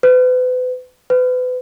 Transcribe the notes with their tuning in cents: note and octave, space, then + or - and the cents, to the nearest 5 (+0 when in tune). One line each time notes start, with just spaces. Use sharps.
B4 +40
B4 +35